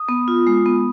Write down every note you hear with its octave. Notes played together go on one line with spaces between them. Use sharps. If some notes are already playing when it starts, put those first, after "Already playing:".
Already playing: D#6
B3
F4
G#3
B3